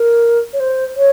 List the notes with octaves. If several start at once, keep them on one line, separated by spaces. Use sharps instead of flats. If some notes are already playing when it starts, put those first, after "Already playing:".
Already playing: A#4
C#5
C5
C#5